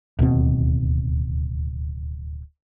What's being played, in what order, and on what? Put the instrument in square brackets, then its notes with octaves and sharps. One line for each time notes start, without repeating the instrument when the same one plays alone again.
[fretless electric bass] D1 D#2 B2 C4